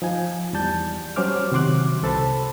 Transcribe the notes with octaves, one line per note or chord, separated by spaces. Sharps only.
F3 D#4 G#5
E2 G3 D5 A5 G6
F#3 G3 C#4 C5 D6 F6
C3 D#3 F#4 C6 D6 F#6
C2 A4 C5 A5 B5 C6